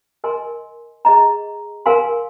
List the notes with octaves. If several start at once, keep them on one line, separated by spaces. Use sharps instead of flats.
A#4 D#5 G#5 C6
G#4 D#5 A#5
A#4 F5 G#5 C6